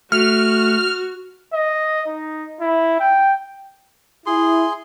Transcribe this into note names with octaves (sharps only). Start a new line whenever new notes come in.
A3 F#4 F6
D#5
D#4
E4
G5
E4 G#4 C6